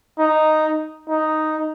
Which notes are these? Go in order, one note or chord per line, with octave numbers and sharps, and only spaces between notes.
D#4
D#4